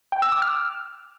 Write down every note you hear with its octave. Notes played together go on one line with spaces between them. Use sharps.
G5
E6
D6
F6